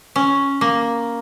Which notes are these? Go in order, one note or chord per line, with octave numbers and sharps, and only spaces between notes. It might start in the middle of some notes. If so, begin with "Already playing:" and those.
C#4
A#3